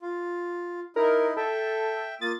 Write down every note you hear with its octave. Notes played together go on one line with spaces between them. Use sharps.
F4
D#4 E4 A#4
A4 E5 G5
A#3 F4 D#6 A6